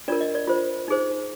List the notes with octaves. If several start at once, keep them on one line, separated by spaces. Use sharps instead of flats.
D4 F4 A#4 D5
D#5
D5
F4 C5
D#4 G#4 C5